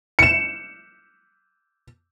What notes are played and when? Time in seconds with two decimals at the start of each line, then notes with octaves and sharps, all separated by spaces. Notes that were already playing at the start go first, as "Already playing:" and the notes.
0.19 C#7 E7